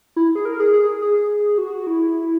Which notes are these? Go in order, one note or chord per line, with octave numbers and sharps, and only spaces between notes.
E4
G#4
A#4
G#4
G#4
G#4
F#4
E4